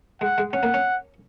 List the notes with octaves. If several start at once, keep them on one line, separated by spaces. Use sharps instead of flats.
G#3 F#5
G#3
C#4 F#5
A#3
C#4